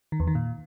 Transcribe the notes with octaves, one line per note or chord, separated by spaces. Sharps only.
D#3
E2
D#3
A#2